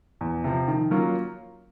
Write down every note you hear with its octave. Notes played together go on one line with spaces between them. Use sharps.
E2
C3 F3
D#3
F#3 A#3 C#4 F4